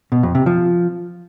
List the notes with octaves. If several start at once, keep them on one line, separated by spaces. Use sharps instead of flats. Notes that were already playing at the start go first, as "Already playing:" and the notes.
B2
F2
C3
F3